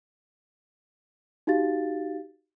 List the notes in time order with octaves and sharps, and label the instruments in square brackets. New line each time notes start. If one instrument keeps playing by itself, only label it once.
[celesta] D#4 F#4 G4 F5 A6